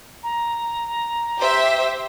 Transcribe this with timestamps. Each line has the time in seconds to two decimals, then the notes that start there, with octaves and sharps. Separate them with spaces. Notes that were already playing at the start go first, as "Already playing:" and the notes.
0.23 A#5
1.39 G4 C5 E5